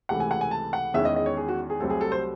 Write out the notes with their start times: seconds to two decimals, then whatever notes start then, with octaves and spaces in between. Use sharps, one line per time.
0.09 C#2 C3 E3 A3 F#5
0.20 G#5
0.31 F#5
0.41 G#5
0.51 A5
0.73 F#5
0.94 E2 D#3 G#3 C#4 E4 E5
1.05 D#5
1.16 D#5
1.26 C#5
1.37 G#4
1.49 F#4
1.70 G#4
1.80 C2 C3 F#3 A3 C4 A4
1.90 G#4
2.01 A4
2.12 C5